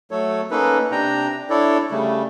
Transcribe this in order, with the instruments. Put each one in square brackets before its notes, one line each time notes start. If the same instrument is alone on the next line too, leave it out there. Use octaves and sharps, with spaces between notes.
[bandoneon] F#3 A3 A4 C#5
A#3 C#4 D#4 A4 B4
C3 D4 G5 A#5
D4 E4 A4 C#5 D5
C#3 G3 A3